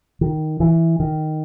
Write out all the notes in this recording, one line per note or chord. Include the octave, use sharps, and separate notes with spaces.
D#3
E3
D#3